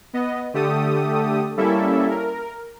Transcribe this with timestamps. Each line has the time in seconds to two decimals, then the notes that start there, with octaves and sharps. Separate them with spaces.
0.13 B3 D#5
0.54 D3 A3 G4 A4 D#6
1.57 G3 A#3 C#4 E4 A4 E5
2.10 A#4